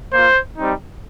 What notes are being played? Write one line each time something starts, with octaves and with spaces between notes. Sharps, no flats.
A#3 F4 C5
G3 C4 D#4